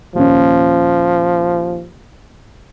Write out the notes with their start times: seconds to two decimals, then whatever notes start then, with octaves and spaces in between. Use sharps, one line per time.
0.15 D#2 A#2 F3 C#4